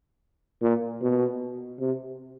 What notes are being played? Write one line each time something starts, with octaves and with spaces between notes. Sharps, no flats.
A#2
B2
C3